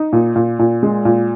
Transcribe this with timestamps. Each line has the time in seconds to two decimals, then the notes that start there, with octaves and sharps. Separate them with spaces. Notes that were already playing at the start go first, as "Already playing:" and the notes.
Already playing: D#4
0.13 A#2
0.36 A#2
0.59 A#2
0.83 G#3
1.05 A#2